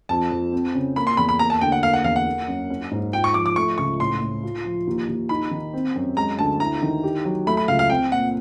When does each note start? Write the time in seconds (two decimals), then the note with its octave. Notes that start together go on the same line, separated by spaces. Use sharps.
0.09 F2 A5
0.32 F2
0.52 C4
0.75 C#3
0.96 A#3 B5
1.07 C6
1.17 E2 B5
1.29 B5
1.39 A#3 A#5
1.50 A5
1.61 D2 G5
1.72 F#5
1.83 A#3 F5
1.93 F#5
2.04 E2 F5
2.16 F#5
2.26 A#3
2.48 F#2
2.70 C#4
2.91 G#2
3.13 F4 G5
3.24 C#6
3.34 F3 D6
3.46 D6
3.56 A3 C#6
3.78 C#2 C#6
4.00 A2 C6
4.22 A2
4.43 F4
4.64 F3
4.87 D#2
5.08 D#2
5.29 D#4 B5
5.51 D#3
5.73 C4
5.96 F#2
6.17 G#3 A#5
6.39 D2 A5
6.60 E4 A#5
6.82 D#3
7.03 G4
7.25 F#3
7.47 A3 B5
7.57 B5
7.68 C#2 F5
7.79 F5
7.90 C4 G5
8.12 A#2 F#5